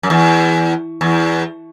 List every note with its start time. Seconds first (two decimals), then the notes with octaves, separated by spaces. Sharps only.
0.03 F#2
0.10 E2
1.01 E2